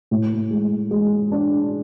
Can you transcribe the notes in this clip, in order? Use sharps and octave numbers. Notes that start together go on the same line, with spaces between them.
A2
G#3
G#3
D4